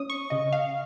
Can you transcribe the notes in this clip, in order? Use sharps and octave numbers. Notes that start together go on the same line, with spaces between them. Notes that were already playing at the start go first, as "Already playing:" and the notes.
Already playing: C#4 D#6
C#6
C#3 D#5
F5